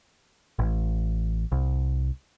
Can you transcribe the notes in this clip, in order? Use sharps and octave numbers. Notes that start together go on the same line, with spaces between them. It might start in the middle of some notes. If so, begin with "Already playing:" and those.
A1
C2